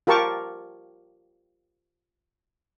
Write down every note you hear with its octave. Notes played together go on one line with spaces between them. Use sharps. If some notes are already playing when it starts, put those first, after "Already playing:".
F4 G4 A#4 A5 C#6 D6